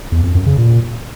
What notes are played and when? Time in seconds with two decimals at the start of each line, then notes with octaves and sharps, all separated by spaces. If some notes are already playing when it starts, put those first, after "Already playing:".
0.12 E2
0.23 F2
0.35 F#2
0.46 C#3
0.58 A#2